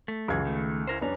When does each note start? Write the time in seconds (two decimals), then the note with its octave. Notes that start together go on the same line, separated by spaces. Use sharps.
0.08 A3
0.28 C#2 F#2 E3 G#6
0.45 D#3 A3
0.87 E4 A#4 C5
1.01 F2 G3 C#4 D4 B4 A#5